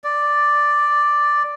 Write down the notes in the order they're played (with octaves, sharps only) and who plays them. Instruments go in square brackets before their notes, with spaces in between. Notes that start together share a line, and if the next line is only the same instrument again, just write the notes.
[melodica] D5